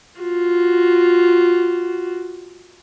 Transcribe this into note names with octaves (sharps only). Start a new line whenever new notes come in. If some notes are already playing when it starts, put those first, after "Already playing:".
F4 F#4